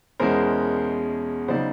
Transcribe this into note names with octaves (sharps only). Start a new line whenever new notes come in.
E2 B2 G#3 C#4 E4 A#4 C5
C#3 F#3 B3 D#4 C5 D5